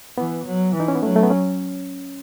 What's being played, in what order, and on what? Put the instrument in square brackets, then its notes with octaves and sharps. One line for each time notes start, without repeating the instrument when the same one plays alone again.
[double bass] E3 [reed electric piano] B3
[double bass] F#3
E3
[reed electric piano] D#4
C#4
B3
[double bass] F#3 [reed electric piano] A3
[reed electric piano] A3
B3
C#4